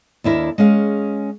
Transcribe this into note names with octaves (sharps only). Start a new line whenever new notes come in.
D#2 D4 E4 A#4
G#3 C#4 G#4 F5